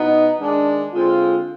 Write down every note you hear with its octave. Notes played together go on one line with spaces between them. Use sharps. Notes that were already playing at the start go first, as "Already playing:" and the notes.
Already playing: B2 B3 D#4
D#3 G#3 D4
D3 G#3 C4 F4